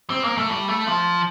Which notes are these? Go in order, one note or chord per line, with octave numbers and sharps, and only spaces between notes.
C4
A#3
A3
G3
A3
F3